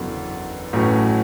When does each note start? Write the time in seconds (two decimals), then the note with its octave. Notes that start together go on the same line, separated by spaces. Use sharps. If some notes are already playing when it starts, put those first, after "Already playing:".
Already playing: F#1 E2 D3 F#3
0.73 A1 A2 F#3 C#4